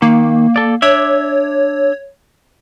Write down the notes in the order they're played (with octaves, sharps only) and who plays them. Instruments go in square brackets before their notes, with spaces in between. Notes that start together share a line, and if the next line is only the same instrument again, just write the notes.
[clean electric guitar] D#3 [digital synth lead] A#3
[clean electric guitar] A4 D5
[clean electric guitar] D4 D5 E5 [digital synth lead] C#5